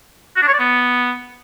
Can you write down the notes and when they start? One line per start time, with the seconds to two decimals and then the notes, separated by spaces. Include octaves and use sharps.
0.36 F#4
0.42 D4
0.48 C#5
0.54 D5
0.59 B3